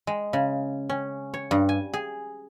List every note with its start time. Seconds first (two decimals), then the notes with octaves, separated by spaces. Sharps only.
0.07 G#3
0.33 C#3
0.90 C#4
1.34 C#5
1.51 G2
1.69 G#5
1.94 G#4